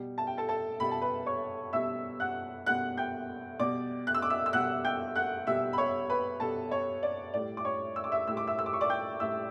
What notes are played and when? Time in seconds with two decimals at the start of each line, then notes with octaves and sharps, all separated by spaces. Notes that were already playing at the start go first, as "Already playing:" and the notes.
Already playing: B2 G3
0.18 A5
0.27 G5
0.37 A4 A5
0.49 A4 A5
0.80 B2 G3 B5
0.91 A5
1.02 B4 B5
1.26 C#5 C#6
1.73 B2 G3 E5 E6
2.20 F#5 F#6
2.66 B2 G3 F#5 F#6
2.98 G5 G6
3.60 B2 G3 D5 D6
4.07 F#6
4.15 E6
4.22 D6
4.30 E5 E6
4.46 E6
4.53 B2 G3 F#5 F#6
4.85 G5 G6
5.16 F#5 F#6
5.47 B2 G3 E5 E6
5.73 B5
5.78 C#5 C#6
6.10 B4 B5
6.40 B2 G3 A4 A5
6.71 C#5
7.03 D5
7.34 A2 G3 D5
7.57 D6
7.65 C#5 C#6
7.96 E6
8.04 D6
8.12 E5 E6
8.27 A2 G3 E6
8.37 D6
8.47 E5 E6
8.59 E6
8.66 D6
8.73 C#6
8.81 D5 D6
8.90 G5 G6
9.20 A2 G3 E5 E6